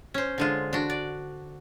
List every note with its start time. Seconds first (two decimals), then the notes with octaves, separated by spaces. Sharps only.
0.14 C#4 C5
0.38 D3 G#3 F4
0.73 D4 F#4
0.90 D5